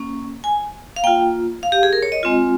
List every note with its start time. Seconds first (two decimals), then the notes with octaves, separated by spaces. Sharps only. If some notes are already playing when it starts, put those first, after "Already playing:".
Already playing: A#3 C#4
0.44 G#5
0.96 F5
1.04 A#3 F4 G5
1.63 F5
1.72 G4
1.83 G#4
1.93 A#4
2.03 C#5
2.12 D#5
2.23 G#3 C4 F4